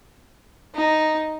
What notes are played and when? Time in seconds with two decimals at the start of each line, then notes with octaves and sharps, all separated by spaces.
0.75 D#4